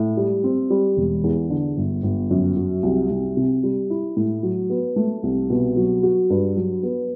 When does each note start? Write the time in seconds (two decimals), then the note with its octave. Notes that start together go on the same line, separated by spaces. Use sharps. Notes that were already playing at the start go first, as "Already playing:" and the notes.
Already playing: A2
0.17 G3
0.44 C4
0.70 G3
0.97 E1
1.24 E2
1.50 D3
1.77 G1
2.03 G1
2.31 F#2
2.57 F#3
2.83 C2
3.10 C2
3.37 C3
3.63 G3
3.90 E4
4.17 A2
4.43 F#3
4.70 B3
4.96 A3
5.23 C2
5.50 B2
5.76 F#3
6.03 F#4
6.30 G2
6.56 F#3
6.83 B3